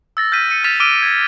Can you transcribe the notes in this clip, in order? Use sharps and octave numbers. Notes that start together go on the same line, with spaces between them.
E6 A6 A#6
F6 G6 A#6 B6 D#7
C#7 D#7
F6 A6 B6 E7 F7
D6 E6 F6 D7 D#7 G7
G#6